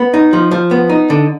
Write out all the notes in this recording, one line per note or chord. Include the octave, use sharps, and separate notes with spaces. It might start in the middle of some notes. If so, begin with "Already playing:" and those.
Already playing: B3
D#4
F3
F3
B3
D#4
D3